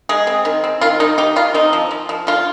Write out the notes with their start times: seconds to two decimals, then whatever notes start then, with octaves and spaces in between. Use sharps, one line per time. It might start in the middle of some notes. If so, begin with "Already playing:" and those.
0.09 G#3 G#4
0.27 C4
0.45 D#3
0.64 C4
0.81 D#3 F4
1.00 D#3 D#4
1.18 D#4 G4
1.36 D#3 F4
1.54 C4 D#4
1.73 F3
1.91 F3
2.09 F3
2.27 D3 F4